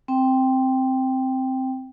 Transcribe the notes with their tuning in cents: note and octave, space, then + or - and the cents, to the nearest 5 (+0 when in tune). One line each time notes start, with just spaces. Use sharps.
C4 +0 G5 +0